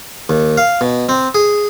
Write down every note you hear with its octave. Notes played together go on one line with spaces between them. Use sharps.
D#2
F5
B2
C4
G#4